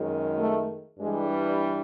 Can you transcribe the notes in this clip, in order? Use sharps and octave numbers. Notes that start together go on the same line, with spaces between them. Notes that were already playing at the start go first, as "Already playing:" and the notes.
Already playing: F#2 D#3 G#3
A3
G2 E3 G3 G#3